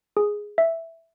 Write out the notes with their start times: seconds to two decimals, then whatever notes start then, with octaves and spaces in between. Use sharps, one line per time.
0.17 G#4
0.58 E5